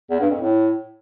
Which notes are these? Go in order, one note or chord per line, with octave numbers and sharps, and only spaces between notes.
E2
G2
F2
A2